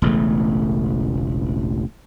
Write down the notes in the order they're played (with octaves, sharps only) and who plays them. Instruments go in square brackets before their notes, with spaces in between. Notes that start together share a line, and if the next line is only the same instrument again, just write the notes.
[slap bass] E1 A1 C#3 A3